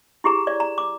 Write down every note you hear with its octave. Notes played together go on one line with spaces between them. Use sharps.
E4 G4 G#4 A#5
D5
A#5
D6